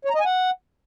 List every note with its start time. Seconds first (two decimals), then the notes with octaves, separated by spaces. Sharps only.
0.05 C#5
0.10 A#5
0.15 D#5
0.20 G#5
0.25 F#5